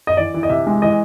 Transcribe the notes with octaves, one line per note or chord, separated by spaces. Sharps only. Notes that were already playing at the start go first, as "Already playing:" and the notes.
D#5
E3 D5
E3
D#5
C3 E5
G#3
E3 D#5